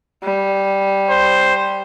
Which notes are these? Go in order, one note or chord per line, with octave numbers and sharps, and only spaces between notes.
G3
C5